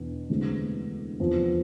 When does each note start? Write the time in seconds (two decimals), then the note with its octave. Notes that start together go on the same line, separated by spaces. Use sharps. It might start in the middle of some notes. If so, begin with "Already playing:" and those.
Already playing: E2 B2 B3 D4
0.29 D2 C3 E3 G#3
1.20 E2 C3 F3